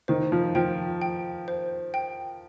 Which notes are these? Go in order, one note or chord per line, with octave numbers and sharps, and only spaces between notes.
D#3 C5
F3
F3 G5
G5
C5
G5